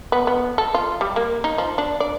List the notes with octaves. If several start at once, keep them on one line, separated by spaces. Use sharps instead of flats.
B3
B3
A4
F4
G3
A#3
D#4
F3
D4
D5